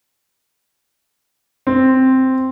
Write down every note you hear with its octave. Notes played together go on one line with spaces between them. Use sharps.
C4